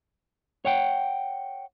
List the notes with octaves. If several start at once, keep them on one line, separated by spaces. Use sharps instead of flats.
C#5 F#5 G5